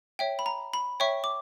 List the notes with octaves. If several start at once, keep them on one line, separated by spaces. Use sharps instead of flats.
C#5 E5 G5
B5
A#5
B5
C#5 E5 G5 C#6
D6